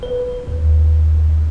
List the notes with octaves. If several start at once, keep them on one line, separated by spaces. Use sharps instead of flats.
B4
D#2